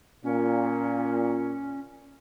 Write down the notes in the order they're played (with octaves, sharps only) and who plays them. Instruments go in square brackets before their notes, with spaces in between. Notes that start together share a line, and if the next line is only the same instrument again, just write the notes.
[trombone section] A#2 [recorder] C#4